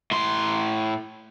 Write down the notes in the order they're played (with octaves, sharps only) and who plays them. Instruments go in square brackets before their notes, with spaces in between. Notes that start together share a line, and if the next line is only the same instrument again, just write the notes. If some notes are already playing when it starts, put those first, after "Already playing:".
[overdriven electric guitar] A2 C6